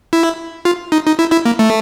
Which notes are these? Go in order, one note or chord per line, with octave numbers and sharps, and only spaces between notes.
E4
F4
D#4
D#4
E4
E4
A#3
A3